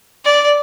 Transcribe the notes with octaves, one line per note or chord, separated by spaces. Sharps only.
D5